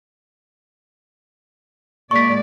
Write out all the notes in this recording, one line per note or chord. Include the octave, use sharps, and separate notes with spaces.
A#2 G#3 D5 C#6 B6